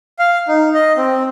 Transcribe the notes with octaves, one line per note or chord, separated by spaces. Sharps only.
F5
D#4
D#5
C4